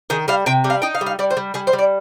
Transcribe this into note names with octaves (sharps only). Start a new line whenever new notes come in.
D#3 G#4
G3 F5
C3 G5
G3
F5
D#4 G5
F5
G3
F5
G3 D5
C5
G3
G3 G#4
C5
G3
D5